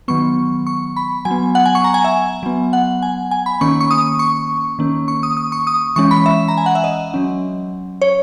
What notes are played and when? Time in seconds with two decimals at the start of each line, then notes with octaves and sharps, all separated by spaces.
0.08 D#3 F#3 B3 C#6
0.67 C#6
0.96 B5
1.25 F#3 G#5
1.31 B3
1.55 F#5
1.65 G#5
1.75 C#6
1.84 A#5
1.94 G#5
2.04 E5
2.43 F#3 B3
2.73 F#5
3.02 G#5
3.31 G#5
3.46 B5
3.61 D#3 A#3 C#4 C#6
3.80 C#6
3.91 D#6
4.19 C#6
4.79 D#3 A#3 C#4
5.08 C#6
5.23 D#6
5.37 D#6
5.52 C#6
5.67 D#6
5.96 E3 G#3 C#4 C#6
6.11 B5
6.26 E5
6.48 A#5
6.57 G#5
6.66 F#5
6.75 E5
6.84 D#5
7.14 F#3 C#4
8.02 C#5